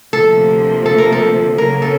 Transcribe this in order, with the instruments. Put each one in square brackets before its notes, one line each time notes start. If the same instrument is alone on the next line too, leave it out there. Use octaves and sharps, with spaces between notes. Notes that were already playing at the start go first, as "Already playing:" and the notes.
[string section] D2 C3 F3 A#3 [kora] A4
[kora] A4
A#4
A4
[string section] C#3 F#3 A#3 C#4 [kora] A#4
[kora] A4